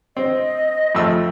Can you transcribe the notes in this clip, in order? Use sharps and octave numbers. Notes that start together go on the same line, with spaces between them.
C4 D#5
F2 A3 E6